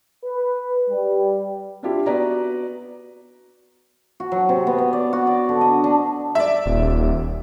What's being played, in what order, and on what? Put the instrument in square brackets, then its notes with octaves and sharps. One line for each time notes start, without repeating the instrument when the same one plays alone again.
[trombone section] B4
G3
[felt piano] C4 D4 E4 F4 G4
B3 F#4 B4 D5 A#5
[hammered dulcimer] F#4
F#3
C3
B3
B3
D5
F#4
D5
D3
D#5
D4
[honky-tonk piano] D5 E5
[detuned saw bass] D#1